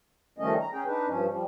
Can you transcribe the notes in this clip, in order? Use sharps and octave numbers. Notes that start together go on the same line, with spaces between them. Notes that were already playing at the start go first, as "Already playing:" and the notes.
D#3 F3 G3 A3 C#4 D#5
A#5
C#4 G#4 G5
D4 D#4 B4
G2 F3 C#4
F3 G3